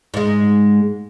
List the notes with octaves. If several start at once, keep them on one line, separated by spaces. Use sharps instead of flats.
G#2 G#3